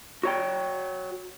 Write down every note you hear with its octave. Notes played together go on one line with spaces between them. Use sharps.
F#4 C#5 G5